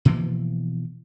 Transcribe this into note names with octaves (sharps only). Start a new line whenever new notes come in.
B2 E3 F3 A#3